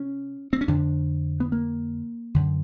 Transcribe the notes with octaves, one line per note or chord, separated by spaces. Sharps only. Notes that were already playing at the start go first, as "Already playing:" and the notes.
Already playing: C3 C#4
C4
C#4
F2 D3 D4
B3
A#3
F#2 D3